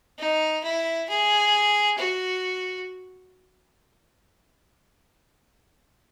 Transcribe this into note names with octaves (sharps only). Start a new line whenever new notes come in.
D#4
E4
G#4
F#4